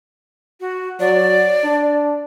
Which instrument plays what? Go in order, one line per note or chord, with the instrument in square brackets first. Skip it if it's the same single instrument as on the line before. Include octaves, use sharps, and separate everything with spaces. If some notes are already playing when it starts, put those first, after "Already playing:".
[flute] F#4
[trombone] F#3 [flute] D5
[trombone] D4